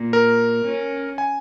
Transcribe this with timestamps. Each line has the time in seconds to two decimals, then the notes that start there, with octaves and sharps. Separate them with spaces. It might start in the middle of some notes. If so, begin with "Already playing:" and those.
Already playing: A#2
0.13 A#4
0.65 C#4
1.18 G#5